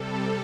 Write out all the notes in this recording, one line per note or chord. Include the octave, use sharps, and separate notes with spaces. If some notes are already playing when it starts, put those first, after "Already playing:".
Already playing: C3 G3 A4